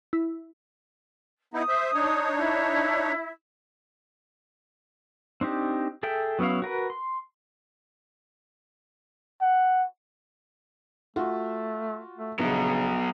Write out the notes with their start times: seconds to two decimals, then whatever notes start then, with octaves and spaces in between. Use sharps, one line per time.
0.13 E4
1.54 B3 D#4 E4 D#6
1.68 C5 E5
1.94 D4 D#4 C#5
2.39 E4
5.41 C4 D4 D#4 G4
6.03 G#4 A4 E5 G5
6.39 F#3 B3 C#4 E4 F5
6.62 F#4 A#4 B4
6.90 C6
9.41 F#5
11.16 A3 F4 F#4
12.17 A3
12.39 A#1 C#3 F#3 B3